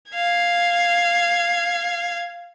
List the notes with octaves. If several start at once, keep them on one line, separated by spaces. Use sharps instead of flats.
F5 G#6